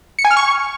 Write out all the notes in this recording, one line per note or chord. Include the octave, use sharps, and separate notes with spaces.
C#7
G#5
F6
C#6